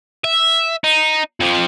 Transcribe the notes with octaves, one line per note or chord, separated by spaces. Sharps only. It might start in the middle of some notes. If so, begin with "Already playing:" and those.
E5
D#4
F2 F3